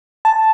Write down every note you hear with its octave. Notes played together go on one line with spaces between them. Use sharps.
A5